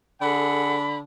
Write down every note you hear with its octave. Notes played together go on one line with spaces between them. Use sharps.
D3 G#4 A4 F#5 B5